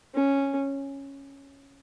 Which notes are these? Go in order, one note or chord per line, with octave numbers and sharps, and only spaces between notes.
C#4